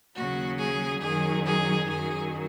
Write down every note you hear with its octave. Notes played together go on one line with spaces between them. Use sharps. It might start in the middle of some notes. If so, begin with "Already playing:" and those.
D#2 C#3 F#3 F#4
G#4
F#2 D#3 F#3 G#4
G#4
F#2 D#3 F#3 G#4